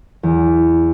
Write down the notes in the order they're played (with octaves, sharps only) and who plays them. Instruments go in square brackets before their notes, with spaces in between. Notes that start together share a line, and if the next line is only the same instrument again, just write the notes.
[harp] E2